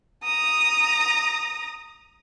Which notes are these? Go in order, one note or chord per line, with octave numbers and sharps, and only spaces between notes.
A#5 D#6